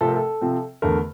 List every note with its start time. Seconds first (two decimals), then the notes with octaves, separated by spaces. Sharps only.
0.01 C3 F3 A3 C4 A4
0.08 A#4
0.16 A4
0.41 C3 F3 C4
0.82 E2 D3 A3 A#4